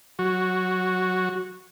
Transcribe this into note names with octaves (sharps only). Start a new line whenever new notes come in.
F#3 F#4